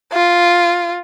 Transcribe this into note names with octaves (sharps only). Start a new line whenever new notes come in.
F4